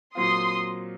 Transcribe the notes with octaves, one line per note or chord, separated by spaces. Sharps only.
A#2 F#3 C4 F4 C6 D#6